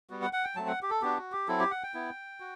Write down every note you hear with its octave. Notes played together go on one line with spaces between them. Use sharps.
G3 B3 F#4
F#5
F#5
G5
F#3 A3 C4 A5
F#5
G4
A4
B3 D4 F#4 G4
F#4
G4
F#3 C4 E4 A4
G4
F#5
G5
B3 E4
F#4